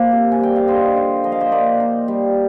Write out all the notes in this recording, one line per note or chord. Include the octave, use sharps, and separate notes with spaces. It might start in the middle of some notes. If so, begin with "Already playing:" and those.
Already playing: F3 A#3 A#4 D5
C3
G#5
G3 G5
F5
D3 C5 D#5
F4
F3 D#5
F5
C5 D#5
A#2 A#4 D5
D#4
G3